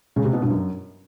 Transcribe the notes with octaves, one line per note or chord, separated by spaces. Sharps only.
C#3
C3
B2
G2
F#2